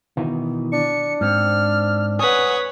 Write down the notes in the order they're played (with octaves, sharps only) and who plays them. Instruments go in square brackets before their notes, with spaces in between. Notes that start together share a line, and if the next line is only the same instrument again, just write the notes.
[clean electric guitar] B2 D#3 E3
[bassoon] D4 [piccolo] C#7
[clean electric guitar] G#2 C4 [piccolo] F6
[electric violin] B4 C#5 [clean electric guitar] F#5 G#5 [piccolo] D#6